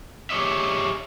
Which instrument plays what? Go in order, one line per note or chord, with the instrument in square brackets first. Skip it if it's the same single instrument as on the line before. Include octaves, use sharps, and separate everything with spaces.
[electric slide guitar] G4 G#4 B4 C#5 D#5 E5